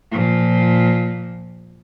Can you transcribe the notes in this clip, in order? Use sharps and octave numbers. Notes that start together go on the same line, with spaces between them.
A#2 F3